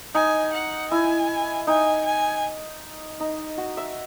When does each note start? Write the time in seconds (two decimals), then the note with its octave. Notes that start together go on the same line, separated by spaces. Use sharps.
0.14 D#4 G#5
0.53 F#5
0.91 E4 G#5
1.67 D#4 G#5
2.06 G#5
3.20 D#4
3.58 F#4
3.77 E5